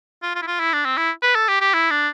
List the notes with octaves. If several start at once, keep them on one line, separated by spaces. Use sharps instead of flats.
F4
F4
E4
F4
E4
D4
C4
E4
B4
A4
G4
G4
E4
D4